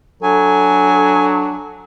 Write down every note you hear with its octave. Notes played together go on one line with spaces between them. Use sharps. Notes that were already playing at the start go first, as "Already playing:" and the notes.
F#3 D4 A4 G#5